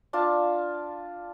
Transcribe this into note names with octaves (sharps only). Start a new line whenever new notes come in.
D4 F4 F5 A5